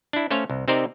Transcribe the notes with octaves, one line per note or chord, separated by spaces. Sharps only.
D4 E4
A3 C#4 C5 C#5 F5
C2
C3 C4 D#4 A#4 C5 D5